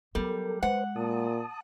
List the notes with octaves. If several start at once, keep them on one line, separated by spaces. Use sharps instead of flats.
F#3 G3 B3 A4 A#4
G#3 B4 C5 F#5
A#2 A5 D#6